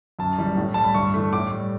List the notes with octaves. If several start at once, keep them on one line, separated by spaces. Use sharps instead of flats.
F#2 A5
E3 G3
A2
G3 A5
B5
G2 C#6
E3 A3
A2 D6
G3